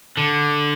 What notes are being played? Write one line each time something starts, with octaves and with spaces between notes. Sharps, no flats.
D3